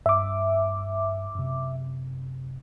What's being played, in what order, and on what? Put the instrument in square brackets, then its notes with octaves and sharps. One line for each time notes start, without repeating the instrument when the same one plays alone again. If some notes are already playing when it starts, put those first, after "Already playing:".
[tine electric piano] G2 [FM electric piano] E5 D6
[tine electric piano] F#2 C3